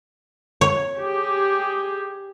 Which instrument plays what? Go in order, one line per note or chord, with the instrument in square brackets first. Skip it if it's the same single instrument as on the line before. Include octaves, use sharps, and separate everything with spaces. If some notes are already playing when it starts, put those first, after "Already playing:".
[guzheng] C#5
[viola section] G4 G#4